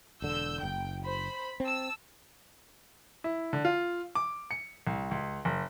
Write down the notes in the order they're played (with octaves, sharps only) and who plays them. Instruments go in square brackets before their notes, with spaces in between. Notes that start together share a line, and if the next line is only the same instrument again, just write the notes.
[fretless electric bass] E1 D3 [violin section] E6 G6
[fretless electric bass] F#1 [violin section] G5
[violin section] C5 B5
[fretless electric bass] C4 [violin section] A5 E6
[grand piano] E4
D3
F4
D6
C#7
C2
C#2
F#1